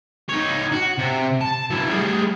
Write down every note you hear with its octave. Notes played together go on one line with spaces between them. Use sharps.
D#4 C#5
F#4
C3
A5
F#3 E4
G3 G#4